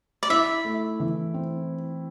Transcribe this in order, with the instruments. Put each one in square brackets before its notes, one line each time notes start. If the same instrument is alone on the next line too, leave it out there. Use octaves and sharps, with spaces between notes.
[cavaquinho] D5
[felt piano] E4 [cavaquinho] E5
[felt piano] A3
E3
C4